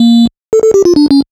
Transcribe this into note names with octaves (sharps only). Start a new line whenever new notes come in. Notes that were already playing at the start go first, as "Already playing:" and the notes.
Already playing: A#3
A4
A4
G4
F4
D4
C#4